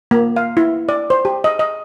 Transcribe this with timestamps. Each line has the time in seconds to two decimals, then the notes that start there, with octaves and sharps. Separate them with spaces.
0.11 A#3
0.36 F5
0.57 E4
0.89 D5
1.10 C5
1.25 G4
1.44 D#5
1.59 D#5